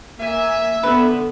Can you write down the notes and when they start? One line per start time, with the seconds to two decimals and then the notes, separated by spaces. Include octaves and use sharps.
0.20 A#3 E5 G#5
0.83 D3 B3 B4